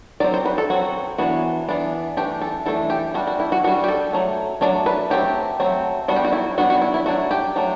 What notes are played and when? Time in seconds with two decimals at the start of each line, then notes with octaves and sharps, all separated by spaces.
0.20 F#3 C4 D5
0.34 C5
0.45 B4
0.58 A4
0.70 F#3 C4 F#4
1.18 E3 B3 D4 F#4
1.68 E3 B3 D4
2.17 E3 A3 D4 G4
2.41 A4
2.66 E3 A3 D4 A4
2.90 G4
3.14 G3 D4 F#4
3.27 F#4
3.40 E4
3.52 F#4
3.64 D4 F#4
3.67 G3
3.84 G4
3.88 A4
4.13 F#3 A3
4.61 F#3 A3 D4 D5
4.86 B4
5.10 F#3 A3 C4 G4
5.60 F#3 A3 C4
6.08 G3 B3 D4 F#4
6.16 G4
6.25 F#4
6.33 E4
6.58 G3 B3 D4 F#4
6.70 F#4
6.82 E4
6.94 E4
7.06 F#3 A3 D4 F#4
7.31 G4
7.56 F#3 A3 D4